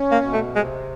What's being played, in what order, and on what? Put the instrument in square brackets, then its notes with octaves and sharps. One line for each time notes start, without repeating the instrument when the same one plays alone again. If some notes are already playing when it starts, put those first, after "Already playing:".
Already playing: [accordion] C#4
[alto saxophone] A#3
[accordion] B2
[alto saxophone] A3
[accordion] C3 [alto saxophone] G#3